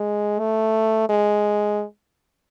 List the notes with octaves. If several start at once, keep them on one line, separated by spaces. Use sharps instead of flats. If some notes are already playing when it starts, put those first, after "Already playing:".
Already playing: G#3
A3
G#3